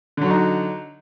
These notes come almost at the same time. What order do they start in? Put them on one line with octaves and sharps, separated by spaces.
D3 F#3 F#4 D#4